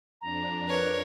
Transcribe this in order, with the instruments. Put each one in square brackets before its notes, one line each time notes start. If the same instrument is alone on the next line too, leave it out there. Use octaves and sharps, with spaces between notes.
[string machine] F2 D4 [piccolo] A#5
[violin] A#4 C#5 [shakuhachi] B4